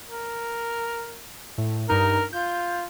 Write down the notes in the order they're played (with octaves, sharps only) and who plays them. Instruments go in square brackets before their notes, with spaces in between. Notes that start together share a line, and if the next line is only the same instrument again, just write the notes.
[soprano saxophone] A#4
[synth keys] A2
[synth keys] G2 D#4 [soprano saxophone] A#4
[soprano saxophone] F4 [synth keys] G6